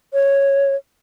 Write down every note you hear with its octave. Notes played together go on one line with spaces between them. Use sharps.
C#5